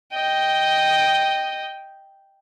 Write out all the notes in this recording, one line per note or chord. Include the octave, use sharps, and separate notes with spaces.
D#5 G5